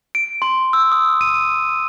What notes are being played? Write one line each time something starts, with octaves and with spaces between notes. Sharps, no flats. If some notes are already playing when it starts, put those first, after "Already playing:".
D7
C6
E6
D#6
D#7